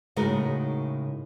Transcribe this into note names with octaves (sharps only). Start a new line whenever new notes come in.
A2 C#3 G#3 D#4 F#4 A#4